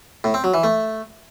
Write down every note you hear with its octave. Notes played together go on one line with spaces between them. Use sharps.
A2
C4
F#3
E3
A3